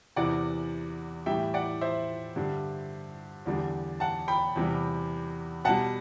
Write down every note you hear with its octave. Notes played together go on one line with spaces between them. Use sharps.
E2 C3 E3 D5 F#5
A2 E3 G3 E5 G5
D5 F#5
C5 E5
G2 D3 G3
E2 D3 G3
F#5 A5
G5 B5
E2 C3 G3
B2 G3 F#5 A5